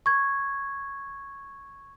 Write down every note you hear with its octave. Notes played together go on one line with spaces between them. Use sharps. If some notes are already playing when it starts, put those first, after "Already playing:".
C#6 G#6